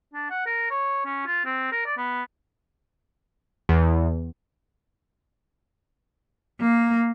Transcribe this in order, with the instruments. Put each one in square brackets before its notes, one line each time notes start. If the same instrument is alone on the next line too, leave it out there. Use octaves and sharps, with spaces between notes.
[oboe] D4
F#5
A#4
C#5
C#4
F4
C4
A#4
D5
B3
[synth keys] E2
[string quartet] A#3